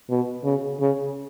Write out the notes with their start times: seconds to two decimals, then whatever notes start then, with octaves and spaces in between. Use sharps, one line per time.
0.10 B2
0.44 C#3
0.80 C#3